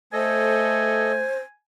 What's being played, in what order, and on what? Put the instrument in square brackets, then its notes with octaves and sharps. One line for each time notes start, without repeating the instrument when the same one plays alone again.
[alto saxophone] A3 [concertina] A4 D#5 [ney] C5 [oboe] G#5